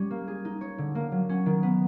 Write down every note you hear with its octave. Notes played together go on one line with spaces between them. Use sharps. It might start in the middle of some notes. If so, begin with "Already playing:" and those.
Already playing: G3 C#4
A#3
G#4
D#4
C#5
D3
A#3
F#3
C#4
D#3
B3